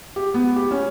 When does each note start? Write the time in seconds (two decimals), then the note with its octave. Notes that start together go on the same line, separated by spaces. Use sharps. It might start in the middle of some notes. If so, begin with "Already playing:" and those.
0.16 G4
0.34 B3
0.56 G4
0.71 C#4